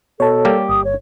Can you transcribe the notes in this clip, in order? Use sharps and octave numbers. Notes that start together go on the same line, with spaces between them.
B2 A4 C#5 A5
G3 A#3 G4
G1 D#6
C#5